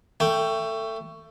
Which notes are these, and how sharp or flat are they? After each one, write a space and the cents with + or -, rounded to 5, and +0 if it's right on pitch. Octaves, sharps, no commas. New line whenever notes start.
A3 +20 G5 +0